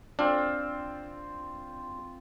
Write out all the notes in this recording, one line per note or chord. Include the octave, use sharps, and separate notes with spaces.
C4 D4 F4